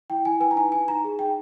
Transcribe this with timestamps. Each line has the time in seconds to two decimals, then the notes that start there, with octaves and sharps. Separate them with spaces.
0.10 E4 G5
0.25 E4 G#5
0.40 B4 G#5
0.51 A#5
0.56 D#4 G#5
0.72 D#4 G#5
0.87 D#4 A#5
1.04 G#4
1.19 D#4 G5